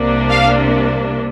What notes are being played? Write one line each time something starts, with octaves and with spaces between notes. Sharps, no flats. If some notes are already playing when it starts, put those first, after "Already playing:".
Already playing: C2 C3 A#3 D4
F5